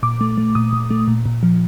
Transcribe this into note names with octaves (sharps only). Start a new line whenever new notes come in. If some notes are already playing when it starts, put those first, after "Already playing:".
A#2 D6
A3
A3
A#2 D#6
A#2
A3
A#2
A#2
F3